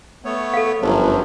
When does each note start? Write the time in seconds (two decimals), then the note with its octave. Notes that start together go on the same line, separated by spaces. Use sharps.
0.24 A3 B3 C#5
0.54 A4 F5
0.82 G1 F#2 F3 F#3